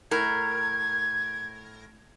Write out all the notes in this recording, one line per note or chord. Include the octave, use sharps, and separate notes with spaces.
A2 A#4 G#6